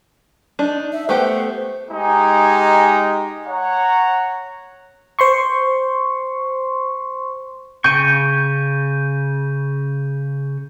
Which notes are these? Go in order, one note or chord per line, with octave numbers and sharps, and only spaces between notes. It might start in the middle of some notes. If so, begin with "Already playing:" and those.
D4 D#4
E5
A3 B3 G4 C5
G#3 D#4 G4 G#5 A#5
C#5 F#5 A#5
C5 C6 C#6
C#3 G5 C#6 G6 D#7